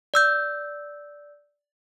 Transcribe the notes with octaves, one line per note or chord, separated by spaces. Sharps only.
D5 E6 G6